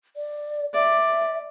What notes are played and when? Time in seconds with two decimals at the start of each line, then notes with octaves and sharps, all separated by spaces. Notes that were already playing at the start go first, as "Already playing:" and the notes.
0.16 D5
0.74 D5 E5